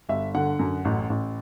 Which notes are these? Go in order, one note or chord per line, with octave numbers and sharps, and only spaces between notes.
G1 E5
D3 F#5
F#2
A1
A1